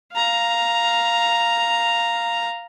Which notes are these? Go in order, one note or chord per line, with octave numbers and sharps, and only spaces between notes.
F5 A#5